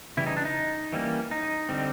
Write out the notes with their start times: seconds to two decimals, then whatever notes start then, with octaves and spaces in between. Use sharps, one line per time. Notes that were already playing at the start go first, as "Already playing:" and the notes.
0.17 C#3 E3 G3 E4
0.27 D#4
0.37 D4
0.45 D#4
0.93 E3 G3 A#3 C#4
1.31 D#4
1.69 D3 G3 C4